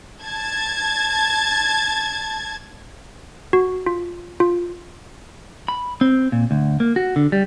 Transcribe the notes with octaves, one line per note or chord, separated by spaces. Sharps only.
A5 G#6 A6
F#4
F4
F4
B5
C4
A#2
D2
A#3
F#4
D3
G3